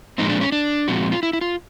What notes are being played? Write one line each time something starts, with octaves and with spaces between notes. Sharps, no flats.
A#2 F3 G#3 C4 D#4
D4
C#4
D4
A#2 F3 G#3 C4 F#4
F4
E4
E4
F4